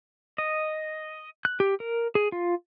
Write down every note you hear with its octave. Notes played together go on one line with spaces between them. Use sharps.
D#5
F#6
G4
A#4
G#4
F4